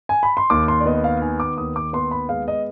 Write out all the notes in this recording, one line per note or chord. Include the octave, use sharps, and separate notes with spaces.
G#5
B5
C6
D#2 D6
C6
D5
B3 D#5
F5
D#3 G#5
D6
D#2 D#6
D6
B3 C6
B5
G#3 F5
D#5